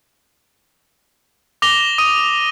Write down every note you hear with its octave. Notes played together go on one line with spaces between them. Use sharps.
D6 A#6 F7 G7
D#6 D#7